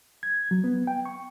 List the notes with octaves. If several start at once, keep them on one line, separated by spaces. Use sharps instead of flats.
G#6
F#3
B3
G5
C#6